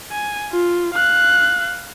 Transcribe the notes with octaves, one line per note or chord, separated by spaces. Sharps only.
G#5
F4
F5 F#6